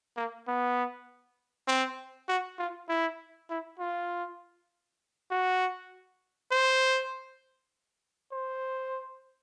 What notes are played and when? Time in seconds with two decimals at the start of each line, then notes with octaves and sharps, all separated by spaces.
0.17 A#3
0.48 B3
1.68 C4
2.29 F#4
2.59 F4
2.89 E4
3.50 E4
3.79 F4
5.31 F#4
6.52 C5
8.32 C5